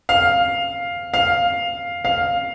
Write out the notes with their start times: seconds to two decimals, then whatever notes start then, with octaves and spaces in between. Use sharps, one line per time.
0.09 F5
1.14 F5
2.05 F5